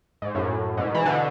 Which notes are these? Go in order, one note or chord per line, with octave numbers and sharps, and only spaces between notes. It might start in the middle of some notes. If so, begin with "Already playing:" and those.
G#2
F#2 A2
G#2 B2
E3
B2 D3